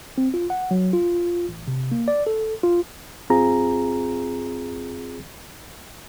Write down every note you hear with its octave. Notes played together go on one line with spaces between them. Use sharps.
C4
F4
F#5
F#3
F4
A1
C3
A#3
D5
A4
F4
F#2 C4 F4 G#4 A#5